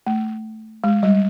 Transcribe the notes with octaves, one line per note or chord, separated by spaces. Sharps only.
A3
G#3
G3